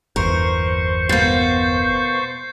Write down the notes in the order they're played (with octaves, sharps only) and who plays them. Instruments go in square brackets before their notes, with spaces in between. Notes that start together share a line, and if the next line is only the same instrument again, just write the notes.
[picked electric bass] G1 E2 [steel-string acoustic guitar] A#4 [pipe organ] C5 C#6
[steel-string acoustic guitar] B2 A#3 [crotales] G6 A6 C7